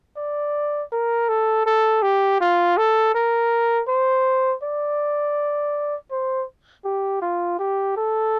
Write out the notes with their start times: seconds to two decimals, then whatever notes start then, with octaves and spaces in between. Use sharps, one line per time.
0.17 D5
0.92 A#4
1.29 A4
1.66 A4
2.02 G4
2.41 F4
2.77 A4
3.15 A#4
3.88 C5
4.63 D5
6.11 C5
6.85 G4
7.22 F4
7.59 G4
7.97 A4